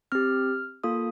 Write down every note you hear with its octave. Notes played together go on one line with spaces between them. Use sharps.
C4 G4 F6
A#3 F4 A4 D#6